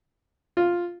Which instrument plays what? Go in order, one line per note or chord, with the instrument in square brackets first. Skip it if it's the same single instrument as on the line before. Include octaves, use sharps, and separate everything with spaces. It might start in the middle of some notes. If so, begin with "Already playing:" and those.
[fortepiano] F4